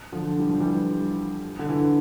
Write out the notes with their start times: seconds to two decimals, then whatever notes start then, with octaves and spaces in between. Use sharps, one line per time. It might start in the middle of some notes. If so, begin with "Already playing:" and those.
0.12 D3 F3
0.39 G3
0.49 F3
0.60 E3 G3
1.59 D3
1.69 E3